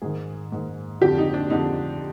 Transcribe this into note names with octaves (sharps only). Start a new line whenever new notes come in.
G#2 D#3 G#4
G#2 D#3
F2 D3 F3 G4
D#4
D4
F2 D3 F3 D#4